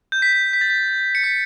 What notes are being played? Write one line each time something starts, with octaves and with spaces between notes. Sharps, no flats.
G6
B6
B6
B6
A6
B6
C#7
B6